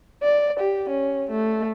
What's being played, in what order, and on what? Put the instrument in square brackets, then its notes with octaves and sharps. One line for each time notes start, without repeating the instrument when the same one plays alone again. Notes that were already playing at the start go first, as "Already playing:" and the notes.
[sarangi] D5
G4
C#4
A3